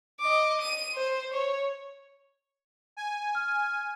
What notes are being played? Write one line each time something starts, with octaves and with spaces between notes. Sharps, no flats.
D#5 D6
D#7
C5
C#5
G#5
F6